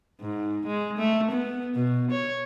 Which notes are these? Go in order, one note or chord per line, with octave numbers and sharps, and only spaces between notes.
G#2
G#3
A3
B3
B2
C#5